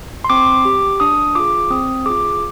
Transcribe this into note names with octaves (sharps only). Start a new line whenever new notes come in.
C6
C4 D6
G4
D4 D#6
F4 G#4 D6
C4 D#6
F4 G#4 D6